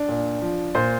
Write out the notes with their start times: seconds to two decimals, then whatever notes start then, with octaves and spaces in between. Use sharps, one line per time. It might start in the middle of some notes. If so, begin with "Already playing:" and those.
Already playing: D4
0.09 A#2
0.41 F3
0.75 A#2 C5